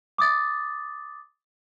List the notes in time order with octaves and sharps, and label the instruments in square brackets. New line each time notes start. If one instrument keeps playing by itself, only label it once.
[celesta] D6 D#6 A6